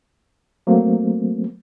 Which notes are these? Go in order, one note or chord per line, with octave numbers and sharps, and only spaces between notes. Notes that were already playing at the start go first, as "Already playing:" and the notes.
F#3 A3 A#3 C4